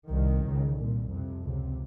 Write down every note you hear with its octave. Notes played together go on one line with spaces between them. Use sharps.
C2 C3 D#3
C#2 C#3
C2 A#2
F2 C3
C#2 C3